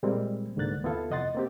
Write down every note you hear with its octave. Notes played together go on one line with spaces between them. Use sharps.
A#2 G3 G#3 A#3 C4
C2 G#2 D3 A#3 F#6 A6
D#2 B3 E4 F4 A4
F2 C3 D#5 F#5 C6 A6
A#3 C4 G4